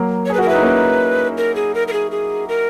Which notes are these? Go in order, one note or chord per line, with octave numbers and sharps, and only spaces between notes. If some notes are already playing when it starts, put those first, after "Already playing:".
Already playing: F#3 A#3
C#5
G#4
B4
F#4
A#4
E4 B4
D#4
A#3 C#4
A#4
G#4
A#4
A#4
G#4
G#4
A#4